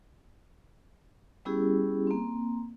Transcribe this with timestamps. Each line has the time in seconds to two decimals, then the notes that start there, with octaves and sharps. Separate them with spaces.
1.45 G3 B3 C#4 E4 G4 G#4
2.07 A#3 C4